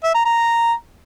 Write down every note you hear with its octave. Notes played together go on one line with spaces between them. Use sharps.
E5
A#5
A#5